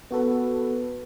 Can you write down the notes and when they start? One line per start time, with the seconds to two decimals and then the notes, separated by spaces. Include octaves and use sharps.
0.11 B3 F#4 A4 B4